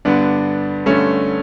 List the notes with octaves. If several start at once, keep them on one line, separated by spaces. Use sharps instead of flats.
G2 D3 B3 D4
G2 D3 A3 C#4